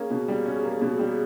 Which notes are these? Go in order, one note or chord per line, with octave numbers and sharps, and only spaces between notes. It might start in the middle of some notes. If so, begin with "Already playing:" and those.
Already playing: A#3 C#4 G#4
B2
G3
C#4
A#3
B2
G3